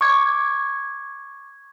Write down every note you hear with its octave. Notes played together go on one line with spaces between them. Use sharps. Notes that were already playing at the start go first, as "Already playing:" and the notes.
C#6 D6 G#6